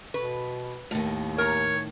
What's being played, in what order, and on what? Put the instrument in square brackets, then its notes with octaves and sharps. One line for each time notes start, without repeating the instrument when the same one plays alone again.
[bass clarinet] B2 [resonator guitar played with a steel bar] B4
[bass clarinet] D#2 [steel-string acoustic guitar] A2 D#3
[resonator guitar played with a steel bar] A#4 A#5 [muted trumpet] C#5